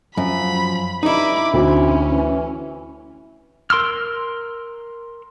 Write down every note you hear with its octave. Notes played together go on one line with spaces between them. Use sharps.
F#2 F3 B5
G2 D#4 E4 B5 D6
D2 C4 C#4
E3
A#4 C6 E6 F6